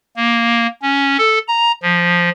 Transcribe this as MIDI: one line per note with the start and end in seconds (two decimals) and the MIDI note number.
0.16 0.67 58
0.82 1.17 61
1.18 1.39 69
1.48 1.72 82
1.83 2.30 53